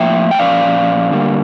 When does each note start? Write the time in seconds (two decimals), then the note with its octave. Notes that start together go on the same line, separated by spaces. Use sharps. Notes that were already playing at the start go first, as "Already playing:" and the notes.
Already playing: A2 F3 A#3 E5 G5
0.31 G5
0.39 A#2 F3 C#4 D5 F5
1.11 D3 G3 A#3